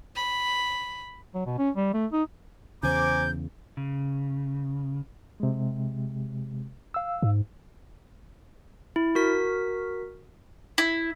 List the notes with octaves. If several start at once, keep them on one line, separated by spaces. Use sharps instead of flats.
B5
F#3
B2
C#4
G3
A3
D#4
E2 C#3 C5 G#5 A#5 D6 G6
C#3
C3 G#3
F5 E6
G#2
E4
F#4 A#4 B6
E4